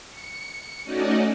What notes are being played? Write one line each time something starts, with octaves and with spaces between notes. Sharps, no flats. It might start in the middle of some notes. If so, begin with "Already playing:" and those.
C#7
A3 C#4 D#4 F#4 D5 D#5